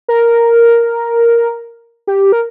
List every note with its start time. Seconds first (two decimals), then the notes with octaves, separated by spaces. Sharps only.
0.08 A#4
2.07 G4
2.32 A#4